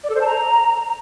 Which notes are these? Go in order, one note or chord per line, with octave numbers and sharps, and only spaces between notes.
D5
A4
C5
A5
A#5